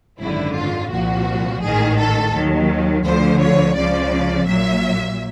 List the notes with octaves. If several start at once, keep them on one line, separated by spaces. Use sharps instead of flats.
G#1 F#2 D3 E4
F4
C2 A#2 F3 F#4
A1 G#2 D#3 G#4
A4
D#2 D#3 F#3
D2 D3 F3 C5
C#5
C#2 C#3 F3 D5
A#1 A#2 F#3 E5